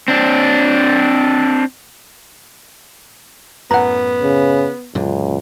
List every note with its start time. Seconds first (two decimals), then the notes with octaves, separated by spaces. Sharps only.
0.08 C4 D4
3.71 F#2 A2 B3 F#5 A#5
4.22 C#3
4.95 C#2 F#2 A#2 D3